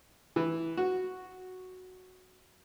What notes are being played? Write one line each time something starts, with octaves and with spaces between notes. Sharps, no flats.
E3
F#4